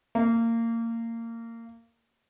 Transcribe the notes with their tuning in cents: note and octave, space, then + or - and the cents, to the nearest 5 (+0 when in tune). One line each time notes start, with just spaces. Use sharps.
A#3 -25